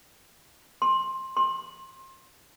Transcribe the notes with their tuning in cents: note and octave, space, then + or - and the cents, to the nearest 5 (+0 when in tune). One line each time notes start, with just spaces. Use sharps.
C6 +15
C6 +25